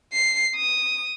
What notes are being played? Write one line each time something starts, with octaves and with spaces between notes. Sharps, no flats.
C7
D#6